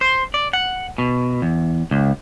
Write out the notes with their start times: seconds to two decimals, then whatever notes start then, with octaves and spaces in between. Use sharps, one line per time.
0.01 C5
0.34 D5
0.53 F#5
0.98 B2
1.42 E2
1.91 C#2